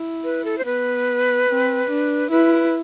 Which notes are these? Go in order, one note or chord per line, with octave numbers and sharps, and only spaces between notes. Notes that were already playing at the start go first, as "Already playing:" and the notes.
Already playing: E4
B4
A4
C5
B3 B4
C4
D4
E4 B4